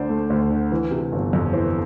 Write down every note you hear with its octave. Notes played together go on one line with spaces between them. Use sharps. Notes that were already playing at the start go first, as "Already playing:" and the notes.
Already playing: D2 D3 D4 C5 D5
A3
D2
D3
E3
C3
G1
F2
E3 C5